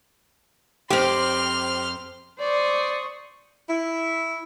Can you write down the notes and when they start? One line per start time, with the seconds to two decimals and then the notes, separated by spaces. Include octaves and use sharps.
0.90 F2 C4 G4 C6 F6
2.40 C5 D5 C#6 D#6
3.69 E4